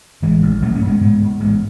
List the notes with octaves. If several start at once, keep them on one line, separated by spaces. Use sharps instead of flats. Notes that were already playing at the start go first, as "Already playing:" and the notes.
A1 E3 G#3
A1
A1 F#3 A3
A3 C#4
G#2
G#3 B3
G#2 G#3 B3
G#2
A1 G#3 B3